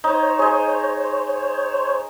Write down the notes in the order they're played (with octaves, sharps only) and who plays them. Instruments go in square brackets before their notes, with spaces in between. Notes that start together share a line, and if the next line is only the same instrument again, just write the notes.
[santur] D#4 [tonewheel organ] C5 C#5
[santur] G#4 D#5